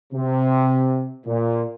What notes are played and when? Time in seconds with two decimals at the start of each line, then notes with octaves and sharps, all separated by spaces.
0.13 C3
1.26 A#2